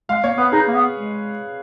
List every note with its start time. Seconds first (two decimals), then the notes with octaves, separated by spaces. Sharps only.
0.09 G#3 F5
0.24 A#3 C#5
0.37 B3 B4
0.52 D#4 G#4
0.68 A#3
0.74 B3
0.95 G#3